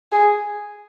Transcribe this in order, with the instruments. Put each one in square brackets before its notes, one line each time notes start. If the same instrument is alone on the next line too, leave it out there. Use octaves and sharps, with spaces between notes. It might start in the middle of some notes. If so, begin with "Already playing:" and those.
[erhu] G#4